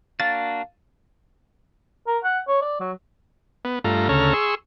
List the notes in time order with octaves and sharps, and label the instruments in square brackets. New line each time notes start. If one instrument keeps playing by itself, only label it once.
[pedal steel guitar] A#3 D4 F#4 [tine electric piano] F5 [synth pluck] A6
[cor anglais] A#4
F#5
C#5
D5
F#3
[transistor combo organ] B3
G2 A3 F4 A#5
D2 C#3 A4 C#5 A#5 F6
G#4 C6 C#6 E6